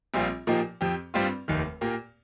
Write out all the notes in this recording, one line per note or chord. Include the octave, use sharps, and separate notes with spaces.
A#1 A#2 G3 C4 F4
A#2 F3 A#3 D#4 G4
F2 F3 C4 G4
G2 G3 C4 F4
F1 D#2 D#3
A#2 A#3 G4